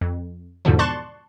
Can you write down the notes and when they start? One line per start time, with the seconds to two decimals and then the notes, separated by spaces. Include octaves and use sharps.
0.01 F2
0.65 E2 G#2 B2 D3 F3
0.79 D5 A5 C6 C#6 F#6 A6